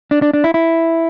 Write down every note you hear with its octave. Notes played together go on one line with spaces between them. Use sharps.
D4
D4
D4
E4
E4